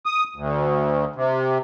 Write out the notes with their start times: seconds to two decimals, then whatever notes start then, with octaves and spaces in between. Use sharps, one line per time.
0.06 D#6
0.36 D2
1.15 C3